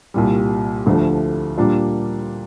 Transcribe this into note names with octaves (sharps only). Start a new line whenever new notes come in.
C2 A#2 G3
D2 D3 F3 A3
A#2 G3 A#3 D4 F4